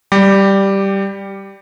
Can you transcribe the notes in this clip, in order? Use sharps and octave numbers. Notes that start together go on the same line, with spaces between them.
G3 G4